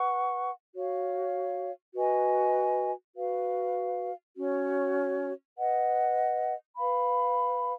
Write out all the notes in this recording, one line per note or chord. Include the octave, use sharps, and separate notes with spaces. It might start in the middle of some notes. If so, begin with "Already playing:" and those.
Already playing: B4 F#5 C#6
F#4 C#5 F5
F#4 B4 D#5 G#5
F#4 B4 F5
C#4 F#4 C#5
B4 D#5 F#5
B4 F5 B5